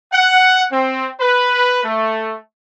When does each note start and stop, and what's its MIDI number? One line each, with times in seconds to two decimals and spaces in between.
0.12 0.63 78
0.72 1.10 60
1.19 1.82 71
1.83 2.36 57